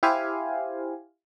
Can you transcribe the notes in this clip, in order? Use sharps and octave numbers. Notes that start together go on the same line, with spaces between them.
E4 G4 C5 F5 G#5